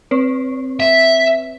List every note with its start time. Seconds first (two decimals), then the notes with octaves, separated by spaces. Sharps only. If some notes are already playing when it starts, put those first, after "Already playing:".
0.11 C4 B4 C#5
0.80 E5